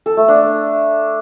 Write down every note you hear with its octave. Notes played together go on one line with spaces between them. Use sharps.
A4
A3
D4